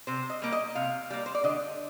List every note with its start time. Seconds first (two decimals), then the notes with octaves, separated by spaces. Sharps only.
0.07 C3 C5
0.30 D#5
0.42 G3 A#3
0.52 D#5
0.75 C3 F5
1.10 G3 A#3
1.26 C5
1.35 D5
1.44 D3 D#5